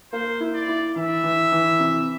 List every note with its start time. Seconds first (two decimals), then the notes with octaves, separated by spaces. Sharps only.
0.13 A#3 C5
0.40 E4
0.54 D5
0.68 E4
0.96 E3 E5
1.24 E3
1.52 E3
1.79 C3